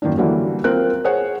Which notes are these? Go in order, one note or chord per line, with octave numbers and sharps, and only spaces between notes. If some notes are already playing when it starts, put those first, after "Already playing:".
F#2 D#3 A#3 D4
D3 E3 F#3 G3 A#3
C4 F4 A#4 F#6
G#4 C5 C#5 F#5